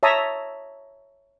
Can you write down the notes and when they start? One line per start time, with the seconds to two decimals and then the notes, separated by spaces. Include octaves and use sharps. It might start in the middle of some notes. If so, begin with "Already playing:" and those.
0.03 C#5 E5 A5 A#5 D#6